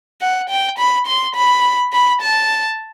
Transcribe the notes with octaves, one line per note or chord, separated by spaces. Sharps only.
F#5
G5
B5
C6
B5
B5
A5